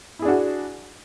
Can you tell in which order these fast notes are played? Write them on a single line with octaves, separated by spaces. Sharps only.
E4 G#4 D4 F#4